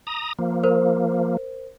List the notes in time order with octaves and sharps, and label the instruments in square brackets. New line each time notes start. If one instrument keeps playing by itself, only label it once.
[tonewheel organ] A#5 D#6
F3 A#3
[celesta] A#4 C5